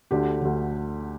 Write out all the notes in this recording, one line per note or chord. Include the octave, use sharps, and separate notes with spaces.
D2 D3 G4
D2 D3